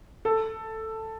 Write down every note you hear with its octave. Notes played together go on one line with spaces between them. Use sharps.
A4